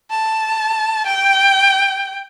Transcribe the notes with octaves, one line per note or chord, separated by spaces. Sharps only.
A5
G5